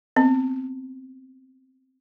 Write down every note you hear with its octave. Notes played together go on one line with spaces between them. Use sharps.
B3 C4